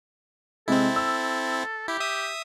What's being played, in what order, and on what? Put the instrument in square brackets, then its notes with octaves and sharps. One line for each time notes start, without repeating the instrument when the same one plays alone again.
[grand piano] C3 G#3 [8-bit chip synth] C4 E4 [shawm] A4
[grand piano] E6
[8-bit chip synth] E4 [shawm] G4
[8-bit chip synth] E5 D#6